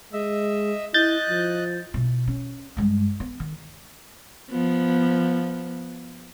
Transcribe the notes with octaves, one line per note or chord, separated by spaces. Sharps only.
G#3 D#5 E5 E6
E4 D#5 F#6 G6 A6
F3
B2 E4
C#4
G2 G#3
B3
D#3
F3 B3